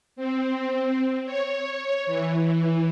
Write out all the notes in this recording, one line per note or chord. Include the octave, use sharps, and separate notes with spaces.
C4
C#5
E3